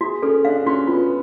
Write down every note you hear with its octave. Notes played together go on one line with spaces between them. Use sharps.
F#4 G#4
C#4 A4
D4 F5
C#4 F#4
B3 F4